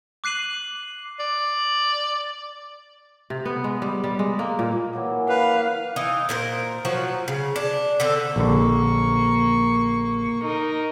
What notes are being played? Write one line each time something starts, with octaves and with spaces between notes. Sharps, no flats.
D6 F#6 C7 D#7 F#7
D5
C3
B3
G#3
G3
G3
G#3
A#3
A#2
E3 F#3 A#3
B4 F5
E3 D#4 F5
A#2 A#4 C5
F3 F#3 F#4
C#3
D4
D3 C4 A4
A#1 D3 A#3 C#6
D#4 A#4